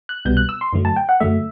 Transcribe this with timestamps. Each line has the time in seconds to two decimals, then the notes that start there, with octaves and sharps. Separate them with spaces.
0.09 F#6
0.25 C2 B2 G3 B3 G6
0.37 F#6
0.49 E6
0.61 C6
0.73 F#2 D3 F#3 A3
0.85 A5
0.96 G5
1.09 F#5
1.20 F#2 D3 F#3 A3 E5